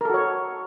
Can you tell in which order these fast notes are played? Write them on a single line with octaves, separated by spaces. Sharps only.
A#4 A4 F#4 C#5